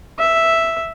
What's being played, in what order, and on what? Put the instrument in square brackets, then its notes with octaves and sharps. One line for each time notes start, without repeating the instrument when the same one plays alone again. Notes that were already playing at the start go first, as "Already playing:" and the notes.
[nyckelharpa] E5